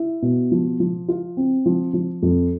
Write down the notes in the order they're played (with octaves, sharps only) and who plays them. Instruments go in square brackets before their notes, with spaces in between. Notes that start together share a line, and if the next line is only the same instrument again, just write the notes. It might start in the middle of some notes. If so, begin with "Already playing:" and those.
Already playing: [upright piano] E4
B2
F3
F3
F4
C4
F3
F3
F2